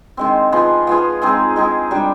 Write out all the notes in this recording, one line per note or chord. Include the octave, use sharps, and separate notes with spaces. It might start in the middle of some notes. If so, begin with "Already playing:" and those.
D#3 G#3 C4
F3 B3 F4 G#4
F3 B3 F4 G#4
G#3 C4 D#4 G#4
G#3 C4 D#4 G#4
G3 D4 G4